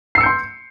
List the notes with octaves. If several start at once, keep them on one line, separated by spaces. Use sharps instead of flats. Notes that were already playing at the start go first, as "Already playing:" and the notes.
C6 E6 G6 C7 C#7